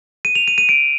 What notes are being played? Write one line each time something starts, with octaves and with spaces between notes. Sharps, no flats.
D#7
F7
D#7
D#7
D7